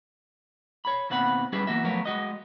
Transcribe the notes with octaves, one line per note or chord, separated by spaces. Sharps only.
C#5 B5
D#2 B2 C4 F#5 B5
G3 C#4 E4 G4 G#4 B4
E2 G#2 E3 A#3 F#4 E5
F3 F#3 A3 B3 A#4 C#5
G#3 F#4 D#5